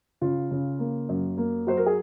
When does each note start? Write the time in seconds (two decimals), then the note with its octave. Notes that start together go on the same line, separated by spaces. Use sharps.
0.21 C#3 F4
0.51 C#3
0.79 A#3
1.09 F#2
1.38 A#3
1.67 F#3 C5
1.77 A#4
1.86 G#4